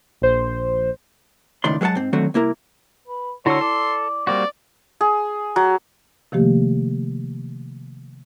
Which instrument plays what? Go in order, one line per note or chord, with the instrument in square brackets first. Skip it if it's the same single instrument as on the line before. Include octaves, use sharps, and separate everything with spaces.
[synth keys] A#1 C5
[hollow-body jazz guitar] C#2 A2 D#3 D5 C6
F#3 G#3 A4 F#5 A5
G#2 C4
D3 D#3 F#3 A3 C4 F#4
C2 A#3 E4 A#4
[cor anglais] B4
[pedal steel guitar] D3 F#4 [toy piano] E4 A5 E6 [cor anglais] C#5 [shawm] C6
[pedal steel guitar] A4 [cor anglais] D5
[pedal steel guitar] G3 A#3 F#4 [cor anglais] C4 [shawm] D5
[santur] G#4
F#3
[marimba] C3 D#3 F3 A3 A#3 G4